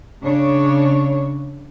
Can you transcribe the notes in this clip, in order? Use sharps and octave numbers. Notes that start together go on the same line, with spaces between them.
C#3 D4 C#5